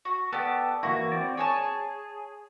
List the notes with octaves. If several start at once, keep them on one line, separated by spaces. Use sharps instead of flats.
F#4
B3 G4 A4 D5
E3 A#3 E4 F#4
C4 D5
G#4 C#5 G#5 A5